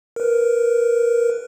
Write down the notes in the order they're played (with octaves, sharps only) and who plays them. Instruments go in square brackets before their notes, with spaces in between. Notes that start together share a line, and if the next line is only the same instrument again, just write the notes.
[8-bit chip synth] A#4 B4